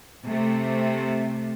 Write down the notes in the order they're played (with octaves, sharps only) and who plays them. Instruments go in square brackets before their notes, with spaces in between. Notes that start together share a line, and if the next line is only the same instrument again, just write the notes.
[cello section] C3 A3